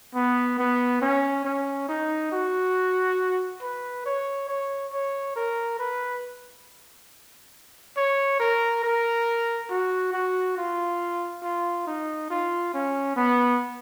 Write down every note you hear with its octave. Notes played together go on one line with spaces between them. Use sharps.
B3
B3
C#4
C#4
D#4
F#4
B4
C#5
C#5
C#5
A#4
B4
C#5
A#4
A#4
F#4
F#4
F4
F4
D#4
F4
C#4
B3